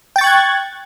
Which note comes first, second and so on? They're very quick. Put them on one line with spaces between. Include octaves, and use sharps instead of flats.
G5 A6 C#6 F#6 G#6